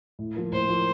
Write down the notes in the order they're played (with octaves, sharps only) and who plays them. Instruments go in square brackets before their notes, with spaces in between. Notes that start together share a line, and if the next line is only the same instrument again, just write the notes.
[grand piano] A2
F3 A#3
[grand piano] A2 [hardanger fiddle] C5
[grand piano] F3 A#3